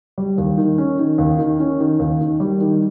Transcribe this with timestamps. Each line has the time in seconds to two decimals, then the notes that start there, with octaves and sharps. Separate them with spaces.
0.18 G3
0.38 D#2
0.58 D#3
0.78 C#4
0.99 D#3
1.18 D#2
1.39 D#3
1.60 C#4
1.80 D#3
1.99 D#2
2.21 D#3
2.40 G3
2.61 D#3